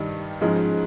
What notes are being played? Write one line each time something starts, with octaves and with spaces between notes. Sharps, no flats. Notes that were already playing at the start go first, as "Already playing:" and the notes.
Already playing: G2 D#3 G3 D#4
G#2 F3 G#3 C#4